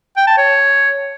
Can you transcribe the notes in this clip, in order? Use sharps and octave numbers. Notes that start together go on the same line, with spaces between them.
G5
A5
C#5